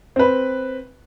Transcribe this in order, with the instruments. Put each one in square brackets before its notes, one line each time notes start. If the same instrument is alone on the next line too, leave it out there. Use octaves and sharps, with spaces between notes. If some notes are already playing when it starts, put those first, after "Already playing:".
[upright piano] C4 B4